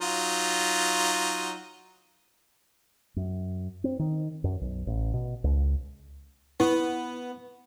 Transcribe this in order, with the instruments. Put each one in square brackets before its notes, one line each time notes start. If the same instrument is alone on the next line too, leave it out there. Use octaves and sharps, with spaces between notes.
[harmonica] F#3 D#4 F4
[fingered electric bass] F#2
C4
D#3
F#2
B1
A1
B2
C#2
[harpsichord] B3 [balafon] E4